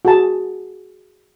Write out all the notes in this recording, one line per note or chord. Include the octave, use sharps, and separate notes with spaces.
F#4 G#4 A5